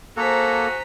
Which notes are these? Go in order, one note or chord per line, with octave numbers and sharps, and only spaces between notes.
A#3 F#4 G#4 A4 C5 A#5 B6